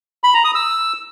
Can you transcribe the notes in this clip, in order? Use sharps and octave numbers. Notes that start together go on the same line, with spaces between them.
B5
A#5
D#6
E6